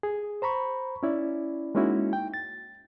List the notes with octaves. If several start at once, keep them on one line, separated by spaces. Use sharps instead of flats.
G#4
C5 A#5 B5 C#6
C#4 E4 D5
G#3 A#3 C#4 D#4 E4 F#4
G5
A6